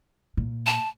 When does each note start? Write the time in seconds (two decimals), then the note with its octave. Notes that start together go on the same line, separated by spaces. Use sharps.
0.37 A#2
0.66 A5